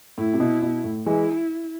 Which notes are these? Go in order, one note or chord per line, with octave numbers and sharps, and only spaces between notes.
A2 E4
C3
B2
B2
A2
E3 G#3 E4